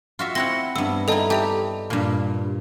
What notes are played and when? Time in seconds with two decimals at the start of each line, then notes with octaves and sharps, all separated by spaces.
0.19 F4 F#4 E5
0.35 C4 E4 F#5 A#6 G7
0.76 G2 B3 E6
1.08 G3 D#4 E4 A4 D#5 A5
1.30 G4 A4 E5 A5
1.90 G2 A#2